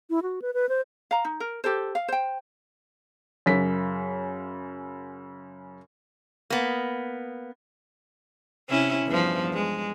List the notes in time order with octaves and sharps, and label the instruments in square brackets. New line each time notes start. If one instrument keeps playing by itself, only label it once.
[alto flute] E4
F#4
B4
B4
C5
[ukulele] F5 A#5
D#4
A#4
G4 A4 C5
F5
C5 G5
[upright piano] F#2 C#3 B6
[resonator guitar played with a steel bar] A#3 B3
[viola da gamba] C3 C#4 E4
E2 G2 F3
G#3